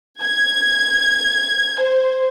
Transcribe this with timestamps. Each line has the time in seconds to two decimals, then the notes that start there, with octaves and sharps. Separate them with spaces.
0.23 G#6
1.81 C5